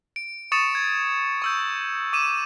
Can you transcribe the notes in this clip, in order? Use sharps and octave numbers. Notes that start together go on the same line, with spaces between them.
D7
C#6 D#6 A6 C#7 E7
G#6
C#6 E6 G6
D6 D#7 E7